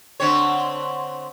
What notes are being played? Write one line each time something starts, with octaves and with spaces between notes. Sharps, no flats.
D3 C4 C#5